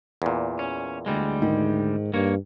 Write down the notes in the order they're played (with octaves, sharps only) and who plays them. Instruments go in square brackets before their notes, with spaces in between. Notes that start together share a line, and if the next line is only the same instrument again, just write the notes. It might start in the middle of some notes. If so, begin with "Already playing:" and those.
[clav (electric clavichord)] E2 A#2
[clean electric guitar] C#4
D2 G3 G#3
[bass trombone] G#2 [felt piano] D#3
[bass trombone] G2 [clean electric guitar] A#3 C#5